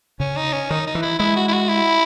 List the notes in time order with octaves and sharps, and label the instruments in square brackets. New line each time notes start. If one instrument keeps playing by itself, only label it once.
[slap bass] C#3 [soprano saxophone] C#4
[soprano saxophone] D#4
C#4
[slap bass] D#3 [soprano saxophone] D#4
[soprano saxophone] D#4
[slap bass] E3
[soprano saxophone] E4
[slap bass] G#3 [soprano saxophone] E4
[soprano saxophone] F#4
E4
F#4
E4